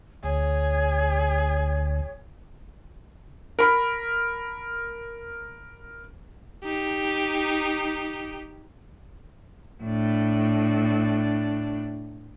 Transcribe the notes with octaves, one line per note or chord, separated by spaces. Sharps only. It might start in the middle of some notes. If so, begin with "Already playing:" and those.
D2 G#4 C#5
A#4 B5
D#4 G4
A2 D4